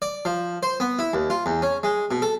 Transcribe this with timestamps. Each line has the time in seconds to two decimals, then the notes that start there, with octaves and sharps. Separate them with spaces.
0.02 D5
0.25 F3
0.63 C5
0.80 B3
0.99 E4
1.13 D#2
1.30 F4
1.46 E2
1.62 C#4
1.83 G#3
2.11 B2
2.22 A4